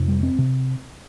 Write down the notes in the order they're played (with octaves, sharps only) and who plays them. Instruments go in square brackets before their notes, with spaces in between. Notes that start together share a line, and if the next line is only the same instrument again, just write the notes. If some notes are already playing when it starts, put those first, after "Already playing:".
Already playing: [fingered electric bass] F2 C3
G3
C4
C3